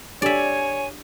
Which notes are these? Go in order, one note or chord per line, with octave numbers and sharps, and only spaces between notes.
D4 G4 A4 C#5 D5 E5 G#5